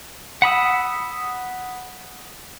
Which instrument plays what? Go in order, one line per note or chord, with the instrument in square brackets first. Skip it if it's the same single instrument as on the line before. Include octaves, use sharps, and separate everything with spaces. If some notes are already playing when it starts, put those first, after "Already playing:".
[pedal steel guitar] F#5 B5 D#6 E6